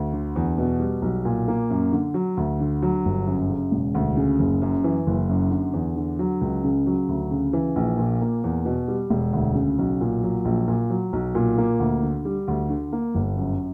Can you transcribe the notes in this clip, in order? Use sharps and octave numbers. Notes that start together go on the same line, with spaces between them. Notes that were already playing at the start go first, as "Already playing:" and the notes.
Already playing: D2
D3
E2
B2
G3
B1
A#2
A#3
F#2
D3
F#3
D2
D3
F#3
G1
F#2
C#3
E1
D2
C#3
F#1
F#2
E3
F#1
F#2
D3
E2
D3
F#3
C#2
C#3
F#3
D2
C#3
E3
A#1
A#2
A#3
E2
B2
G3
E1
D2
C#3
B1
A#2
F#3
A#1
A#2
F#3
B1
A#2
A#3
D2
D3
G3
D2
D3
A#3
G1
F#2